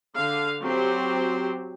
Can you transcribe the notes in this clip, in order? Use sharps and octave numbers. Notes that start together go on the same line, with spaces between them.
D3 F5
F#3 C4 G4 C5